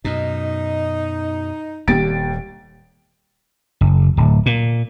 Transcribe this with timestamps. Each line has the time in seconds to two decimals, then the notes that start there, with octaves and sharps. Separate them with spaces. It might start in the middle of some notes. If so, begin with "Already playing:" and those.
0.05 F#2 B2 D#4
1.88 D#1 D#2 G3 A6 D7
3.81 F#1
4.17 D1
4.46 A#2